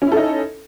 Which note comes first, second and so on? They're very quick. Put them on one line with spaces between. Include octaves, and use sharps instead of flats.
C#4 E4 A4 D#4